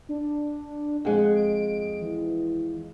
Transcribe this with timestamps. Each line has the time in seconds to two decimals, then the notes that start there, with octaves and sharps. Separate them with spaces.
0.09 D4
1.05 F2 G#3 F#5
1.35 D7
2.01 E3